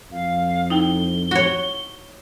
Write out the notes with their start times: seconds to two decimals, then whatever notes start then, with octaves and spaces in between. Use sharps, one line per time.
0.12 F2 F5
0.70 D#4 E4 G5 G7
1.31 F#4 C#5